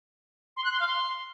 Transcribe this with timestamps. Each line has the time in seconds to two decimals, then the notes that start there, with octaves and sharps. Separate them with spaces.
0.57 C6
0.64 F#6
0.72 C6
0.80 F5
0.88 C6